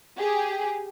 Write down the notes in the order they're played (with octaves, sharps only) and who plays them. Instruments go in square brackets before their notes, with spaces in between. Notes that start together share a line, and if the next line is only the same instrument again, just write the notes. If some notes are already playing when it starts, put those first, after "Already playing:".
[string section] G4 G#4